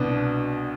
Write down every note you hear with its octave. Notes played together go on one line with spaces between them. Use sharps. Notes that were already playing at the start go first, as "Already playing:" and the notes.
Already playing: C2 B2 B3 D4